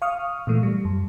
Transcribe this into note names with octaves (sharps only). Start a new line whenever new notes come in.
F5 C#6 D#6 F6
A#2 E3 A3
G3
F#2